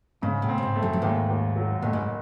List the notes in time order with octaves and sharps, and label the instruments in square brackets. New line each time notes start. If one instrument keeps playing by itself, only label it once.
[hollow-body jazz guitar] G#2 [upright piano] C#3
[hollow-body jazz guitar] A2
[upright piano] C4
[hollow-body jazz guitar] A2
G#2
[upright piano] A3
[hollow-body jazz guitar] F#2
F#2
[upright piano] D#2 [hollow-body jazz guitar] G#2
[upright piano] D#2
F#3
[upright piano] F#1 [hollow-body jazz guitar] A2
[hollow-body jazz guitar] G#2